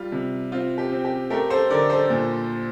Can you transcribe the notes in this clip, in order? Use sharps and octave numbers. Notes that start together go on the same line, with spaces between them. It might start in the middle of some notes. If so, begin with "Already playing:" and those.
Already playing: G3 F4
C3
C4 F4
G4
C4
G4
A3 G4 A#4
A4 C5
D3 A#4 D5
A4 C5
A#2